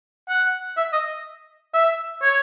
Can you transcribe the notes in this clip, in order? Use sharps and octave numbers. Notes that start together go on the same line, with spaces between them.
F#5
E5
D#5
E5
C#5